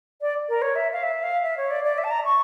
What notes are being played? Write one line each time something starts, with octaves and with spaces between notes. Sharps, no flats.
D5
A#4
C#5
E5
F5
E5
F5
E5
C#5
D5
D5
E5
A5
A#5
C#6